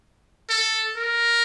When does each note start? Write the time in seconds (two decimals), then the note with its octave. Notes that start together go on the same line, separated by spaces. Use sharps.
0.50 A4
0.97 A#4